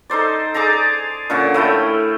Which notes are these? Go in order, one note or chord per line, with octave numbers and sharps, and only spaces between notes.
D#4 A4 C5 D5
G#4 D5 A5 A#5
A#2 D3 C#4 F#5
A2 A3 E4 G5